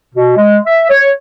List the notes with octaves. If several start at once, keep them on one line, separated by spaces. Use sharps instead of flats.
B2
G#3
E5
C#5